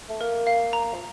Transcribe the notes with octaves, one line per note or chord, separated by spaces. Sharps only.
A3
A#3 A#4
F5
A#5
F3